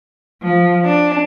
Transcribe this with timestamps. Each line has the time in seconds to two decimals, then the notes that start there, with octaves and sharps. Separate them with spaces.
0.42 F3
0.85 D4